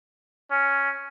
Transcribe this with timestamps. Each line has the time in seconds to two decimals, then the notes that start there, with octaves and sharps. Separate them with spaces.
0.51 C#4